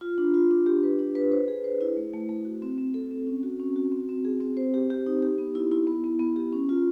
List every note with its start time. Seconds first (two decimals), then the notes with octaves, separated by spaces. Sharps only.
0.01 F4
0.18 D4
0.34 F4
0.51 D4
0.66 G4
0.83 B4
0.99 D4
1.15 B4
1.32 C5
1.48 G#4
1.64 C5
1.81 E4
1.97 A3
2.13 A3
2.29 A3
2.45 F#4
2.62 C4
2.78 C4
2.94 A4
3.11 C4
3.27 C#4
3.43 F#4
3.60 C#4
3.76 F#4
3.92 C4
4.09 C4
4.25 G#4
4.41 C4
4.57 C5
4.74 G4
4.90 G4
5.06 D#4
5.22 G4
5.38 B3
5.55 E4
5.71 E4
5.87 B3
6.04 B3
6.19 B3
6.36 G4
6.52 C#4
6.69 F4